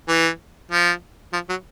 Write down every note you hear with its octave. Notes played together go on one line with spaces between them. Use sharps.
E3
F3
F3
F#3